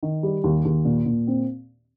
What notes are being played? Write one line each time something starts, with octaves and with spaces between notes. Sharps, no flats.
D#3
G3
D#2
D#2
A#2
A#2
C4